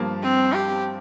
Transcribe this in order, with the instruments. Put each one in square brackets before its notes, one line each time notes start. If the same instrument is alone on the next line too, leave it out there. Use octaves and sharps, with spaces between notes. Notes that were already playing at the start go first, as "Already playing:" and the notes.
Already playing: [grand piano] G2 F3 A#3
[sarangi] C4
G4